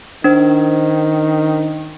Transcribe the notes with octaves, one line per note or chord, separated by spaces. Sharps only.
D#3 D4 C5